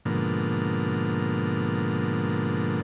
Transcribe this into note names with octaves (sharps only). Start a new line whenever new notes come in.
G#2 B2 D3 F3 A#3